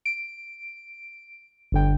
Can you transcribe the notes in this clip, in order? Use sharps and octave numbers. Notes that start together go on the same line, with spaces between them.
D7
G1 D3 G5